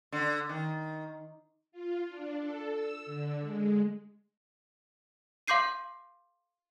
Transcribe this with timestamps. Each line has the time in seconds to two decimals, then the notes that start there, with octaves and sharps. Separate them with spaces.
0.12 D3
0.49 D#3
1.72 F4
2.08 D4
2.40 A4
2.71 E6
3.06 D3
3.39 G#3
5.47 F5 C6 D6 G6 C7 D#7